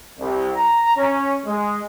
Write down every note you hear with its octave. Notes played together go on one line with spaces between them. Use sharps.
C2
A#5
C#4
G#3